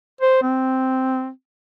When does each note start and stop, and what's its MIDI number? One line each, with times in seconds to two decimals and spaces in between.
0.21 0.40 72
0.42 1.29 60